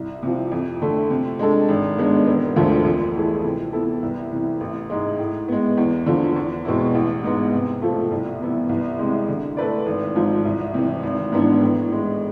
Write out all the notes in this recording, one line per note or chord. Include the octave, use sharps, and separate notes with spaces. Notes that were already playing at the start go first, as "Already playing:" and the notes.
Already playing: C2
C3 F3
F2
D3 A3
C3
G#3 D4 A4
G#1
G#2 G#3 B3 D4
E1
D2 D3 F3 A3
F2
E3 A3 E4 G#4
C3
E3 B3 E4 A4
C2
C3 E3
A1
G#2 G#3
A2
G#3 B3
E2
D3 F3
E2
B2 G#3 C4 E4
A1
G#2 G#3 B3
C3
F3 A3
C2
C3 E3 B3 E4
C2
C3 G#3
D3
A3 E4 B4 D5
G#1
G#2 F3
C2
C3 E3
G#1
G#2 E3 B3 D4
A2
E3 G#3